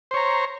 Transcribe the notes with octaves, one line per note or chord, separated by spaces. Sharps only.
C5 C#5 A#5